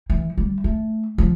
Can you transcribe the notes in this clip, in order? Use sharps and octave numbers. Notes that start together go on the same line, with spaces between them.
E3
G3
A3
F3